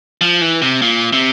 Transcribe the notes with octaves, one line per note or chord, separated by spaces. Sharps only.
F3
E3
C3
A#2
C3